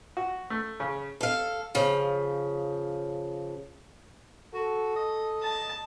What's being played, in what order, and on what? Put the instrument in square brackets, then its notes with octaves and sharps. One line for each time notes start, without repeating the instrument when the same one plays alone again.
[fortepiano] F#4
A3
C#3
[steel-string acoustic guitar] A4 F5
C#3 F3
[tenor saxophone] F#4 [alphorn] A4
[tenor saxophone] D#5
[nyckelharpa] A5